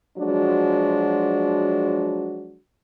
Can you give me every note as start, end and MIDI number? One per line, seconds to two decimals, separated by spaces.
0.19 2.58 53
0.19 2.58 54
0.19 2.58 56
0.19 2.58 62
0.19 2.58 66